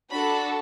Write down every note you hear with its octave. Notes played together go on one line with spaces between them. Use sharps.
D4 F#4 A4 B5